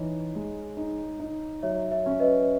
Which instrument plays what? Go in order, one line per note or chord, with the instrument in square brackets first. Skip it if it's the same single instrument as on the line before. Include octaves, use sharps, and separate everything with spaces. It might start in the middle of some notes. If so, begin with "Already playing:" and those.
Already playing: [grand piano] E3 D#4 [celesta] C#5
[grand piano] G#3
D#4
D#4
[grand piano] F#3 [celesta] C#5 E5
[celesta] C#5 E5
[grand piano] C#4
[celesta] B4 D#5